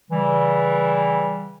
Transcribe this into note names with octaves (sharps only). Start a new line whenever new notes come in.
C#3 E3 G3